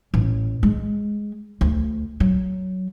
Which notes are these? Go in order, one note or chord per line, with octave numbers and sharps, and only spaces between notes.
A1
G#3
D2
F#3